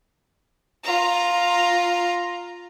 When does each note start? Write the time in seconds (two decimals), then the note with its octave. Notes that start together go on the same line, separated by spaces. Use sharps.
0.84 F4 A#5